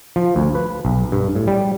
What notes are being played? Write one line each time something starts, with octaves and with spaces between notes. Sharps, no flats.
F3
D2
B4
B1
G2
A2
G3